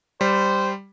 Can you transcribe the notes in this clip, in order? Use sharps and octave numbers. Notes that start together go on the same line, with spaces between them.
G3 C5